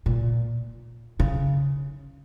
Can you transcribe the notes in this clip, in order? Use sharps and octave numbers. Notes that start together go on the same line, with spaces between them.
A#2
C#3